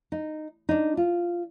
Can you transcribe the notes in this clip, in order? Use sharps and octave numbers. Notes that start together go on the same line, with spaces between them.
D#4
D4 D#4
F4